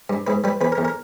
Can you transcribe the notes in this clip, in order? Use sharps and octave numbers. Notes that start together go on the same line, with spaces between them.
G2
G#2 B4
G3 B4
E2 B4
A#4
E2
A#4